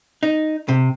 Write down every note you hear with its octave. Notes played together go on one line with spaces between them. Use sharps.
D#4
C3